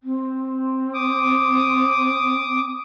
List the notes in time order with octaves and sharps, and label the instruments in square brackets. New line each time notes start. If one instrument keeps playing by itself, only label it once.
[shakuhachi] C4
[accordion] D6 D#6